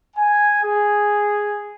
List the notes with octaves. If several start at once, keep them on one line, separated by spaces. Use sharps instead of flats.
G#5
G#4